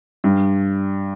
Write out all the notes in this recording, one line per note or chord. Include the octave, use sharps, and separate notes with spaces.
G2